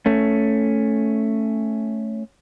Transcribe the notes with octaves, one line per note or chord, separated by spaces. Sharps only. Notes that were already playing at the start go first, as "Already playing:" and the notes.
A3 C#4